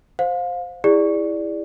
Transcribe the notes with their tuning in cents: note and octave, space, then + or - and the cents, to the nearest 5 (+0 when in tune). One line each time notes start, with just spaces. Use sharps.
C5 +0 F5 +25
E4 +0 G#4 -25 D5 +0